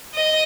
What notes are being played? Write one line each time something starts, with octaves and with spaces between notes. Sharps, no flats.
D#5